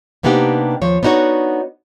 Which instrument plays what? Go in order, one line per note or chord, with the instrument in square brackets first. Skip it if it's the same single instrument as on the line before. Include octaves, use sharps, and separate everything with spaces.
[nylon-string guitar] C3 A#3 B3 D4 D#4 G4
D#2 F3 C#5
B3 D4 D#4 F#4 C#5